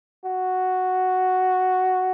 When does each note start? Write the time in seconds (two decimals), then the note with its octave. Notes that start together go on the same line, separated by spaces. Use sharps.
0.24 F#4